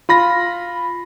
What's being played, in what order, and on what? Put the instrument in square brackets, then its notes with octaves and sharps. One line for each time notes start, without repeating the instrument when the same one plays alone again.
[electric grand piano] F4 B5 A#6